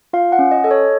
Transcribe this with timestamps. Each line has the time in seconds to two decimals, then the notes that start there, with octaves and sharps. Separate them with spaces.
0.13 F4 F5
0.32 F#5
0.39 C#4
0.51 D#5
0.64 A4 D#5
0.71 C#5